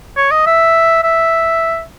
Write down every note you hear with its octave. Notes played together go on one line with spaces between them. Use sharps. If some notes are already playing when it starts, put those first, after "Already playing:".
C#5
D#5
E5
E5